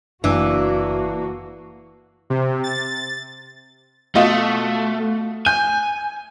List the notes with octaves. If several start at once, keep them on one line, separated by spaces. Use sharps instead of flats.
F#1 E3 A#3 D4 F#4
C3
A6
B2 A3 F4 D#5
G#5 G6